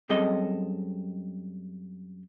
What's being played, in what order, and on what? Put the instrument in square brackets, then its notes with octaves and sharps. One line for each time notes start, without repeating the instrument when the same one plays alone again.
[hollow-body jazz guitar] F#2 G3 C4 G#4 A4 D#5